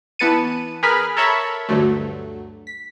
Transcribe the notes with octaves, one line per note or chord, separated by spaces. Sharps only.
E3 B3 B4 A5 C#7 D#7
G#4 A#4 B4 B5 F6
A4 A#4 C#5 E5 A5 B5
D2 G2 D3 F#3 A3
B6